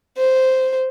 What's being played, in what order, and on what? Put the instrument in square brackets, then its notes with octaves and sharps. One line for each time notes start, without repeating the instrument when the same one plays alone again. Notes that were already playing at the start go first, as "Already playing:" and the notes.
[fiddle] C5